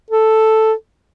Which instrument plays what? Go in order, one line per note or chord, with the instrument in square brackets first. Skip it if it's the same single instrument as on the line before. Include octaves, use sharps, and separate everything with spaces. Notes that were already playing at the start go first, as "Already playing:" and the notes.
[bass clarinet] A4